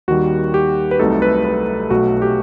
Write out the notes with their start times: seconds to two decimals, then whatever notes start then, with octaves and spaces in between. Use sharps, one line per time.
0.08 D#2 D#3 G3 F#4
0.54 G4
0.91 B4
0.99 C2 C3 F#3 A3 D#4 A4
1.22 B4
1.45 B4
1.90 B1 B2 A3 F#4
2.22 G4